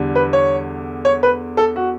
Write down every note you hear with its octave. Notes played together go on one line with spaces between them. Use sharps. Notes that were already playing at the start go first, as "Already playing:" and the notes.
Already playing: E2 D3 G3
B4
C#5
C#5
B4
A4
F#4